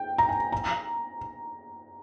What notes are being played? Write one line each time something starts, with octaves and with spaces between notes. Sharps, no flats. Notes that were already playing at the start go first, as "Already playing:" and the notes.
Already playing: G5
A#5
G#5
A#5